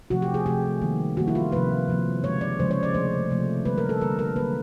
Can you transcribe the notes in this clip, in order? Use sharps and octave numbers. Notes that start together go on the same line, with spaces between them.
C3 F3 A3 F#4
G4
G#4
C3 F3 A3 G4
D#3 G3 A#3
D#3 G3 A#3 F#4
E4
F4
C3 F3 A#3 B4
C3 F3 A#3
C#3 F3 G#3 C#5
D5
C#3 F3 G#3 C5
C#5
D5
C3 F3 A3 C5
C3 F3 A3
D3 G3 A#3 B4
A#4
A4
D3 G3 A#3 A#4
A#4
D3 F#3 A#3 B4